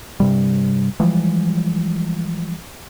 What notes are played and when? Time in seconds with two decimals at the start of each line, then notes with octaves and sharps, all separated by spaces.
0.20 G2 C3 G3
1.00 E3 F3 G3 G#3